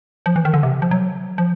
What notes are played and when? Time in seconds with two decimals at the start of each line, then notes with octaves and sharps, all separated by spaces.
0.26 F3
0.36 E3
0.45 D#3
0.54 D3
0.63 C3
0.82 F3
0.91 F#3
1.38 F3